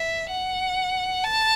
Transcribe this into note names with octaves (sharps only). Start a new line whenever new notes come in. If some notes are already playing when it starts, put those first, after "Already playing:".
Already playing: E5
F#5
A5